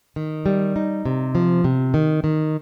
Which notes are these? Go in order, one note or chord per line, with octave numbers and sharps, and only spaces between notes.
D#3
G3
D#4
C3
F3
C3
D#3
D#3